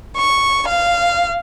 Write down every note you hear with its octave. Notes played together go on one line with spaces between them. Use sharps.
C#6
F5